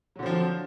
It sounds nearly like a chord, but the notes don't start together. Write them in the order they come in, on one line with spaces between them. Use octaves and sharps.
F#3 D3 C4 F3